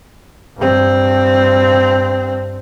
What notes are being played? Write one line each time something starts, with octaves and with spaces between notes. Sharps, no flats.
G2 C4